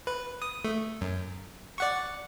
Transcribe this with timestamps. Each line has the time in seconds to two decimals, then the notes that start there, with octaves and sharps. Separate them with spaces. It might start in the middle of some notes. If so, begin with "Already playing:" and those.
0.07 B4
0.42 D#6
0.65 A3
1.01 F#2
1.78 D5 F#5 C#6